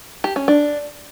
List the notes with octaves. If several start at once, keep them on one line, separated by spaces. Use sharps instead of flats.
G4
C#4
D4